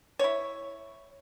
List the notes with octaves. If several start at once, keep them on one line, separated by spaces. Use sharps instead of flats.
E4 C#5